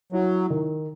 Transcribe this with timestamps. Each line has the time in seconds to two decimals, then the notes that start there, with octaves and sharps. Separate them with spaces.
0.12 F#3 E4
0.50 D#3